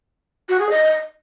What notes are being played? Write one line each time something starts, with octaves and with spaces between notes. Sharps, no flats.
F#4
G#4
D#5